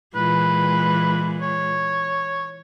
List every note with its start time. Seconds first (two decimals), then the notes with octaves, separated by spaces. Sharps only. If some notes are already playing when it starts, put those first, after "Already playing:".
0.15 A#2 E3 G#3 B4
1.41 C#5